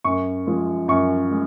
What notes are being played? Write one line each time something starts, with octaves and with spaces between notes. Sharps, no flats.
F#2 C#6
F3 G#3
F#2 C#6
G#3